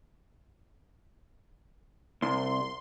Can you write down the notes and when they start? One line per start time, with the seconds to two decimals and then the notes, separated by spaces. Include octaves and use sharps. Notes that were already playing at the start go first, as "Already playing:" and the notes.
2.22 C2 C6